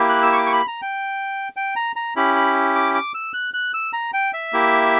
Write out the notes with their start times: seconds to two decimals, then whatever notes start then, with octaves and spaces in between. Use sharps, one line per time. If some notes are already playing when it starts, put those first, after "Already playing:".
Already playing: A#3 E4 G4
0.09 F#6
0.23 E6
0.33 C#6
0.38 D6
0.46 C#6
0.53 B5
0.68 A#5
0.82 G5
1.56 G5
1.76 A#5
1.96 A#5
2.16 C#4 E4 G4 B5
2.36 B5
2.75 D6
2.94 D6
3.14 E6
3.34 F#6
3.54 F#6
3.74 E6
3.93 A#5
4.13 G5
4.33 E5
4.53 A#3 E4 G4